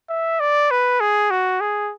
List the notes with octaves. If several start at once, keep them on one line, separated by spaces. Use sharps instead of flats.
E5
D5
B4
G#4
F#4
G#4